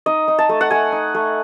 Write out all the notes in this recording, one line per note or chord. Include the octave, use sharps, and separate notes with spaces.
D#4 D#5
D#4
A5
A3
F#5
A3 G#5
D#4
A3